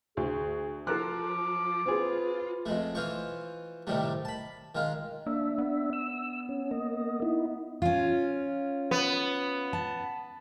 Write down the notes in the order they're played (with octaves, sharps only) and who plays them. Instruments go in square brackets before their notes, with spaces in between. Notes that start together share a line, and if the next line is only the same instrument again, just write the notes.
[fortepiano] D2 [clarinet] G#4
[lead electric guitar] F3 [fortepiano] A4 A#4 F#6 [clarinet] D6
[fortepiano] C4 G#4 [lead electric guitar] F4 [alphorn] B4
[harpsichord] F2 G#3 A3
E3 F4 C5 C#6
A2 C3 D#3 G3 A3
A5 B5
D#3 G#3 F4
[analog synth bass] A#3 [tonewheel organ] D4 E5
[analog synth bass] B3
[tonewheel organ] E6
C#4
A#3 D#5
D#4 E4
[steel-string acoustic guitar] C#4 F4
[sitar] B3
[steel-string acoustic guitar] A5